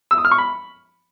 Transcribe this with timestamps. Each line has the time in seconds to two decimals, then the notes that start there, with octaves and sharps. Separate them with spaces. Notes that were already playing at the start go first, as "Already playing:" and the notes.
0.11 E6
0.18 D#6
0.25 F6
0.31 C#6
0.38 B5